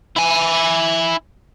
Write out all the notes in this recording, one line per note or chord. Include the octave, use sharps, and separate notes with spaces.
E4 G#5